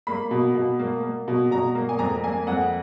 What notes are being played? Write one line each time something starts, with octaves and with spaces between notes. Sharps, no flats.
A#3 B5
B2
B2
A#3
A#3
B2
B2 A#5
A#3
G#5
F2 A#5
A#3 G#5
F2 F#5